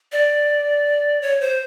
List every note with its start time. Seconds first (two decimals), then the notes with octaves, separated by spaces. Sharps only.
0.12 D5
1.22 C#5
1.41 C5